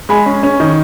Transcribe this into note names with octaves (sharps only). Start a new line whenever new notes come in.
G#3 G#5 B5
C#4
C#4
D#3